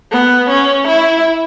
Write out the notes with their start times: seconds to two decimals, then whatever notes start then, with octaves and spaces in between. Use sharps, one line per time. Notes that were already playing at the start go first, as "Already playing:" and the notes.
0.11 B3
0.49 C#4
0.87 E4